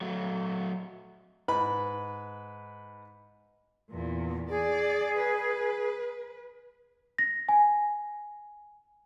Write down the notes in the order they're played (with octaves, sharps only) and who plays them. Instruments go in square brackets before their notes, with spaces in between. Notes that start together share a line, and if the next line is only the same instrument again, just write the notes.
[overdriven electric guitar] F#3 A3
[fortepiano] G#2 B4 B5
[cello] E2 A#2
[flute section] G#4 [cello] D5
[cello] B4
[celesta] A#6
G#5